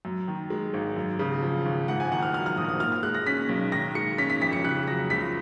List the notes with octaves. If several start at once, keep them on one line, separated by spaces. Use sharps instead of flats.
F#2
D#3
G#3
G#1
F#2
C#3
F3
G#1
G#2 F#5
G#5
D#3 F#5
F6
F#3 F6
F6
A#1 D#6
D#6
A#2 F6
F6
G#3 F#6
A#6
C#4 B6
B1
D#3 A#6
G#3 C#7
C#4 B6
B6
F2 B6
C#7
C#3 F#6
F#3 A#6
C#2 B6